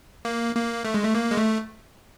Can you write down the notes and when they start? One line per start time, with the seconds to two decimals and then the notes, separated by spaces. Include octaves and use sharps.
0.25 A#3
0.55 A#3
0.85 A3
0.94 G#3
1.03 A3
1.15 A#3
1.31 G#3
1.37 A3